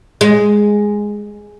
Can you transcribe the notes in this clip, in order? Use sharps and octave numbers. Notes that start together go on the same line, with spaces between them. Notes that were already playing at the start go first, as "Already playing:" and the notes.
G#3